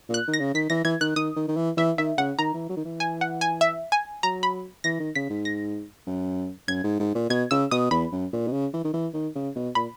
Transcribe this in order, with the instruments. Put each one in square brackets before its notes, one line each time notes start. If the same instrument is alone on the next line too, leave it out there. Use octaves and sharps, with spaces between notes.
[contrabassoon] A#2
[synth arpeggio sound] F#6
[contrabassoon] D#3
[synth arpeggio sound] A#6
[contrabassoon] C#3
[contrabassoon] D#3 [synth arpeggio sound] B6
[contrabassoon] E3 [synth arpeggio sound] A#6
[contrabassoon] E3 [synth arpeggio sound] G#6
[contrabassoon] D#3 [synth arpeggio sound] F#6
[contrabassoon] D#3 [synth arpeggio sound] D#6
[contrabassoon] D#3
D#3
E3
[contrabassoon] E3 [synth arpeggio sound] E5
[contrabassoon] D#3 [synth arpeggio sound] E5
[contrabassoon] C#3 [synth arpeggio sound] F#5
[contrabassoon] D#3 [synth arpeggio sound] A#5
[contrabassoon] E3
F#3
D#3
E3
[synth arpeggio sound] G#5
F#5
G#5
E5
G#5
[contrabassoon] F#3 [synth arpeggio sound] A#5
[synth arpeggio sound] B5
[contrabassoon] E3 [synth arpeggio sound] A#6
[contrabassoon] D#3
[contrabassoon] C#3 [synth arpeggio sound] B6
[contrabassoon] G#2
[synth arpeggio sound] A#6
[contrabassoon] F#2
[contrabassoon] F#2 [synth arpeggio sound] G#6
[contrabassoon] G#2
G#2
A#2
[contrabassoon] B2 [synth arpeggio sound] G#6
[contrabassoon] C#3 [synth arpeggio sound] E6
[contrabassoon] B2 [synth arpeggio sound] D#6
[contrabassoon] E2 [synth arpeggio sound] B5
[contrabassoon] F#2
A#2
B2
C#3
E3
D#3
E3
D#3
C#3
B2
[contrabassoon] A#2 [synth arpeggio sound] B5